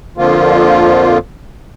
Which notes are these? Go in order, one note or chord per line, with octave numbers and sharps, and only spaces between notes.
F2 D3 F3 A#3 F4